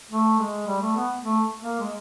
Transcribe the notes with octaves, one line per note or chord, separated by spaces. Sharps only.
A3
G#3
G3
A3
B3
A3
A#3
G#3